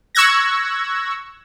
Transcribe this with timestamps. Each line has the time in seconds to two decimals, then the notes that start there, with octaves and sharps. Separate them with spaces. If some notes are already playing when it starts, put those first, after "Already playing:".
0.15 C#6 E6 F#6 G#6 A#6